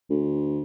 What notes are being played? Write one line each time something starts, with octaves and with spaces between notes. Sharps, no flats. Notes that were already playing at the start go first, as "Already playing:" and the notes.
D2